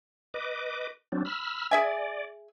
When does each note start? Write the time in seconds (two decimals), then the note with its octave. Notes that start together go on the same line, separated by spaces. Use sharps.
0.34 B4 D#5 D6
1.12 F#3 C4 D4
1.25 B5 E6 F6
1.71 G#4 D5 E5 G#5